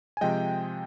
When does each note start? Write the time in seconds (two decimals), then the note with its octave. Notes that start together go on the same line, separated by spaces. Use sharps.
0.17 G#5
0.21 C3 F3 G#3 D#5 G5